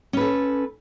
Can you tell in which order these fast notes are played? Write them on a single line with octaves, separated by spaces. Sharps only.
C#4 B4 A4